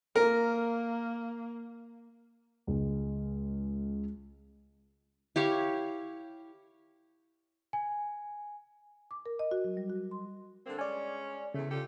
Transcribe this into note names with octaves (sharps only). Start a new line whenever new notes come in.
A#3 A#4
C#2 G#3
E4 G4 C#5 F5
G#5
D6
A#4
D#5
F#4
F#3
G3
F#4
C6
D3 A#3 C4
G#3 C#4 D5 G#5
E2 C#3 A3
F4 G4 A4